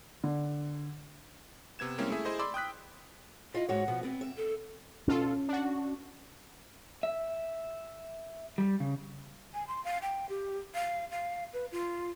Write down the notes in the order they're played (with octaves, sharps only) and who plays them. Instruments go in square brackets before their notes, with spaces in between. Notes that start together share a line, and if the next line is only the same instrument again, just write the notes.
[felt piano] D3
[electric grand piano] C3 B3 G#6 E7
G3 G#3 A#3 C4 C#4 E4
A3 E4 G#4 E5
E4 G#4 C5 D#5
D5 B5 C6 D6 E6
G5 D#6 F#6 B6
[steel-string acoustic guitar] E4 F4 [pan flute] D#5
[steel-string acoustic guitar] G#2 F#4 C#5 [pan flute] F#5
[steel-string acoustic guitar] B2 F3 B3
[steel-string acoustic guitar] B3 [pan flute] C4
[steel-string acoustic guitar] E5
[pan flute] A4
[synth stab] B2 F4 A4 [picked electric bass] C#4
[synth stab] D4 F#4
[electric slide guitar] E5
G3
C#3
[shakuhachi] G#5
C6
F5
G5
G4
F5
F5
B4
F4